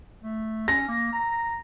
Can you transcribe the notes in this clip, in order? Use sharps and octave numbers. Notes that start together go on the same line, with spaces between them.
A3
C#4 A#6
A#3
A#5